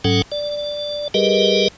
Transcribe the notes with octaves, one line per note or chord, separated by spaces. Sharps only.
G#2 F#3 C#4 A4 F#5 G5
D5
G3 G4 G#4 A#4 B4 D#5